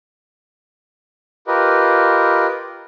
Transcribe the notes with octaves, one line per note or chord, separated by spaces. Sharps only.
F4 G4 A#4 B4 D#5